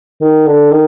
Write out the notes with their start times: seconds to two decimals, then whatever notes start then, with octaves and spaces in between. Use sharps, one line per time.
0.21 D#3
0.46 D3
0.71 D#3